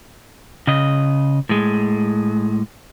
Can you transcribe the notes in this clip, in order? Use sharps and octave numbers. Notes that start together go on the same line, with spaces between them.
C#3 D#5
A2 G#3